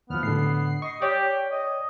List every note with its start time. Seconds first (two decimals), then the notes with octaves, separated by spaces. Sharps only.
0.10 D#2 F3 B3 F6
0.23 A2 D3 C7
0.82 D#5 C#6
1.02 G4 C#5 D5 G5
1.52 D#5